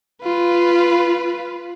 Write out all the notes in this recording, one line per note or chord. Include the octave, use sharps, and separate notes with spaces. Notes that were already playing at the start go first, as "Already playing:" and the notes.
F4 B4